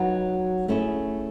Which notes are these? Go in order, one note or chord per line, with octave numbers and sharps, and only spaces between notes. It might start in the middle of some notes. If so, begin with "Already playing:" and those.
Already playing: F#3 B3 D#4
A3 C#4 E4 G#4